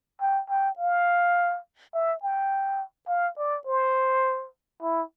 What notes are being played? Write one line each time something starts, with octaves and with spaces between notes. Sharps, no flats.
G5
G5
F5
E5
G5
F5
D5
C5
E4